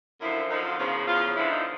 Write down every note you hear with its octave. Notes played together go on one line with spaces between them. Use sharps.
F#2 D3 F3 E4
F#2 D3 F3 D#4
F4
E2 C#3 F3
E2 C#3 F3 F4
G2 D3 F3 E4
D#4